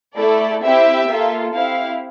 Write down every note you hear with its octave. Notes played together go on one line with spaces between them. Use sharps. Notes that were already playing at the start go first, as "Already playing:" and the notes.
A3 E4 A4 D5
C4 E4 G4 E5
A#3 F4 A4
C4 E4 G4 F5